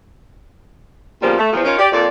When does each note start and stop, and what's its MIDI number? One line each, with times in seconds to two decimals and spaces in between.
1.22 1.35 46
1.22 1.35 49
1.22 1.35 53
1.22 1.35 55
1.22 1.35 58
1.22 1.35 59
1.38 1.51 57
1.53 1.65 40
1.53 1.65 53
1.65 1.77 61
1.65 1.77 63
1.65 1.77 65
1.65 1.77 70
1.65 1.77 73
1.79 1.89 67
1.79 1.89 74
1.92 2.08 41
1.92 2.08 46
1.92 2.08 74